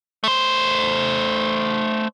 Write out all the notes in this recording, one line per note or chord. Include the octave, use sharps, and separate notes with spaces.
A3 C5